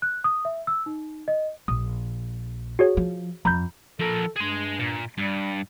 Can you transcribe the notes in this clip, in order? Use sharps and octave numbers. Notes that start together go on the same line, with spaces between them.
F#6
D#6
E5
E6
D#4
D#5
A#1 D#6
F#4 G#4 C#5
F3
F2 A#5 B5 G6
F3 A4 A#4
G2 G#4 C6
A#2
G2 G3